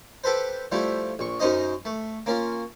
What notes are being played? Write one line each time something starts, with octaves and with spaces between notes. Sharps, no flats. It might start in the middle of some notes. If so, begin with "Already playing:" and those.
G4 A4 B4 C5
F3 G3 A3 E4
A#1 C#6
F#2 C#4 D#4 C5 D#5 D#6
A3
A#3 C#4 F4